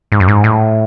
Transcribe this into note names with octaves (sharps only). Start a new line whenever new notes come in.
G#2
F#2
G#2
A2